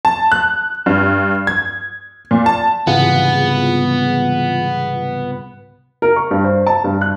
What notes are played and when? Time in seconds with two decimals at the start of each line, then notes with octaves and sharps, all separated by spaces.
0.05 A5
0.32 F#6
0.86 G2
1.47 G#6
2.31 A#2
2.46 A5
2.87 C2 G#2 C#3 E3 B3 F4 G#4
6.02 A#4
6.16 C#6
6.31 G2
6.44 C5
6.67 A5
6.84 G2
7.01 F#6